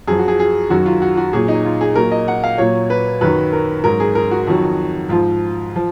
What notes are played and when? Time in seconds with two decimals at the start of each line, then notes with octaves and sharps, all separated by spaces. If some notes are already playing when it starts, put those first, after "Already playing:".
0.08 F#2 F3 G#4
0.19 F#4
0.28 G#4
0.40 G#4
0.70 F#2 D#3 F#3 F#4
0.86 F4
1.02 F#4
1.17 F#4
1.33 A#2 F#3 G#4
1.48 D#4
1.65 F4
1.81 G#4
1.96 A#2 F#3 A#4
2.12 D#5
2.28 F#5
2.44 F5
2.58 A#2 F#3 C#5
2.90 B4
3.21 F#2 D#3 F#3 B4
3.53 A#4
3.84 G#2 F#3 A#4
4.00 G#4
4.15 A#4
4.31 F#4
4.47 F2 D#3 F#3
5.09 G#2 F3 F4
5.76 F3